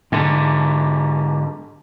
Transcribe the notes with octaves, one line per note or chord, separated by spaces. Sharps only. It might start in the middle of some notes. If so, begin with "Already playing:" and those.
G#2 D3